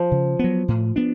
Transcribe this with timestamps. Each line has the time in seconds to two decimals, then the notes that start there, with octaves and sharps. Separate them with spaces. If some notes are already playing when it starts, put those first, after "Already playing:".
Already playing: F3
0.12 C#3
0.39 F#3 B3
0.68 A2
0.96 B3 D4